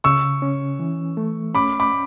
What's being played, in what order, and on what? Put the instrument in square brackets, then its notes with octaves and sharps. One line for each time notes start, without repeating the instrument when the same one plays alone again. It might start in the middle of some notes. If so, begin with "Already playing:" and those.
[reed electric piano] C#3 [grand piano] C#6 E6
[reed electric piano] C#4
E3
A3
[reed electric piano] C#4 [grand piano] B5 D6
[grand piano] B5 D6